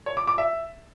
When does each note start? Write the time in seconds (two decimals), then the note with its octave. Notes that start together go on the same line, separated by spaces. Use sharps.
0.06 C#5
0.17 D6
0.27 D6
0.38 E5